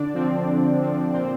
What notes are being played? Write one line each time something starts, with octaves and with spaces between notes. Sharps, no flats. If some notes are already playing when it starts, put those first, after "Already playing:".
Already playing: D3 D4 D5
F3 C4
D3
F3 C4
A#2 C4 C5